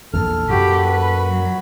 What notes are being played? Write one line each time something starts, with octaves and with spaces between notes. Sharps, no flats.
A#1 E2 A4 F6
F#2 A#2 F#4 G4 B5
B4
F#3